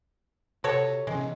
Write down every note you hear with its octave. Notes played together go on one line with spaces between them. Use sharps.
C3 F#4 A4 C#5
C3 E3 G#3 C#4